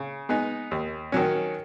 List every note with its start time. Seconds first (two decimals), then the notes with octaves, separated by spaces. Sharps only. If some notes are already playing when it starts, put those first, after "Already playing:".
Already playing: C#3
0.29 G#3 B3 D#4
0.71 D#2
1.12 D#3 F#3 C#4